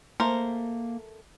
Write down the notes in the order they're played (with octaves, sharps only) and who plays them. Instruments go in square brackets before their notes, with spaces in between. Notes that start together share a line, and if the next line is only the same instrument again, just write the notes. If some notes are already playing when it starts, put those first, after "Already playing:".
[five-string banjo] A3 A#4 C5 [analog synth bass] A#3